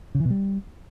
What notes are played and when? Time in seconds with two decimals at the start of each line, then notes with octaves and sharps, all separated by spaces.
0.15 C#3
0.20 E3
0.25 B2
0.30 G3